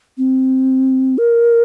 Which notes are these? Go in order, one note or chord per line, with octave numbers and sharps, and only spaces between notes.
C4
A#4